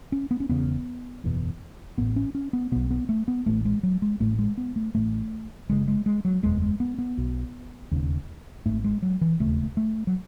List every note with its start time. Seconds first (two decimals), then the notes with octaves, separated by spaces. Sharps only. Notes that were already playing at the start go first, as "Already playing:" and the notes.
0.12 C#4
0.31 B3
0.40 C#4
0.49 E1 E2 C#3 B3
1.24 F#1 E2 B2
1.98 A1 A2 B3
2.16 C#4
2.35 C#4
2.53 B3
2.72 B1 B2 B3
2.91 B3
3.09 A3
3.28 B3
3.46 A1 A2 A3
3.65 G#3
3.83 F#3
4.02 G#3
4.20 A1 A2 A3
4.39 G#3
4.58 B3
4.76 A3
4.95 A1 A2 A3
5.69 F#1 F#2 C#3 G#3
5.88 G#3
6.06 G#3
6.25 F#3
6.43 F#1 E2 B2 G#3
6.62 G#3
6.80 B3
6.98 B3
7.17 B1 B2
7.91 E1 D#2 C#3
8.66 G#1 G#2 A3
8.84 G#3
9.03 F#3
9.21 E3
9.40 E1 D#2 C#3 A3
9.77 A3
10.07 F#3